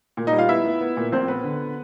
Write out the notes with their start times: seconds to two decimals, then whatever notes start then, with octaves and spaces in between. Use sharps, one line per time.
0.17 A#2
0.27 D#4 D#5
0.33 G3
0.39 F4 F5
0.49 B3 E4 E5
0.65 B3
0.81 B3
0.97 A#2
1.12 A#1 C4 C5
1.28 B3 B4
1.44 D3